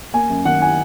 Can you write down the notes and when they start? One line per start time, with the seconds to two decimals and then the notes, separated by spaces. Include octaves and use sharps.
0.13 A#3 G#5
0.30 F#2
0.45 D#3 F#5
0.61 E4 G#5